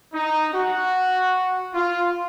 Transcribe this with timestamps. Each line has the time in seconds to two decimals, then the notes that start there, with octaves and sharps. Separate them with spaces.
0.14 D#4
0.54 F#4
1.74 F4